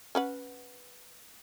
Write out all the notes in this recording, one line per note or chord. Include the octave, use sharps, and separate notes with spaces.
C#4 B4 F#5